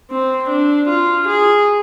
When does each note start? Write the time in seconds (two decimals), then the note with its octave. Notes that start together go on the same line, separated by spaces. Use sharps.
0.11 C4
0.49 D4
0.88 F4
1.27 G#4